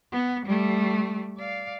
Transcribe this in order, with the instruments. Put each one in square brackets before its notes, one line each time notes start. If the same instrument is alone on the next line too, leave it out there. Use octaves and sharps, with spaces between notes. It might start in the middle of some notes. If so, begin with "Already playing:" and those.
[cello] B3
G3 A3
D5 F5